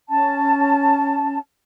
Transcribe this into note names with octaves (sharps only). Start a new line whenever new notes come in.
C#4 A5